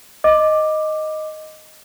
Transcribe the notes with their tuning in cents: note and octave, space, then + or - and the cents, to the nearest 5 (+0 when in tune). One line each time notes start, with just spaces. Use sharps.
D#5 +0 D6 +10